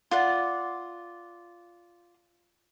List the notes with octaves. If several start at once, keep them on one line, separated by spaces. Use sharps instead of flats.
F4 D5 F#5